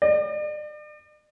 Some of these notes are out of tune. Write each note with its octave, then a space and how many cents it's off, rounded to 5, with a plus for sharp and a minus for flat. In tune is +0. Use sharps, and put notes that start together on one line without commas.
D5 +40